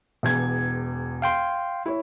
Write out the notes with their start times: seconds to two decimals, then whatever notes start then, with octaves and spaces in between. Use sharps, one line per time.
0.23 E1 E2 G#6
1.22 F5 G5 C6
1.86 E4 C#5